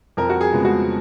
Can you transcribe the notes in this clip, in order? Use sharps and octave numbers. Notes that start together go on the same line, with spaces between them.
F2 A#4
F#4
G#4
C#3 F3 G#3 B3
F#4